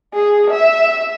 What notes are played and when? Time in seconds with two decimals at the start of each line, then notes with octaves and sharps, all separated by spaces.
0.13 G#4
0.50 E5